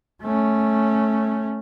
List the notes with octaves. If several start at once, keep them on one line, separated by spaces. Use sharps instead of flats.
A3 C#4